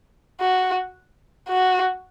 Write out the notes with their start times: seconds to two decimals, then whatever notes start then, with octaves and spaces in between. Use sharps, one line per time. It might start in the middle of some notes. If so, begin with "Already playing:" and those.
0.41 F#4
1.49 F#4